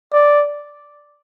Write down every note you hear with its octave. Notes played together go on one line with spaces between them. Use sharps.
D5